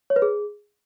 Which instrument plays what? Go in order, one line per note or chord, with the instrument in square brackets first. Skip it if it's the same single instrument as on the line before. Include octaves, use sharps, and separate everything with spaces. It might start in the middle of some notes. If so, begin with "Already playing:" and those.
[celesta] C#5
B4
G#4